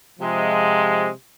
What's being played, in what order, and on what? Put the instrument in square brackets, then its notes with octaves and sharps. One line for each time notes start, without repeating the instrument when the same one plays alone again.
[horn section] C3 F3 G#3